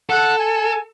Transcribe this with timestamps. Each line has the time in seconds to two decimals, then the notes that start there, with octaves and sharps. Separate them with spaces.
0.09 A4 F#5
0.39 G#5